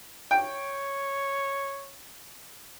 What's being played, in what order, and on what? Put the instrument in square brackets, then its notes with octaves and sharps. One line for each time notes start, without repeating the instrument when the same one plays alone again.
[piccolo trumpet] C#5 [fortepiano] G5